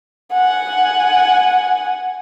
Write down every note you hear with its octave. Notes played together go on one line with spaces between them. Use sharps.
F#5 G#5